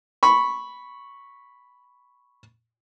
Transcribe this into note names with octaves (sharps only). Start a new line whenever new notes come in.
B5 C#6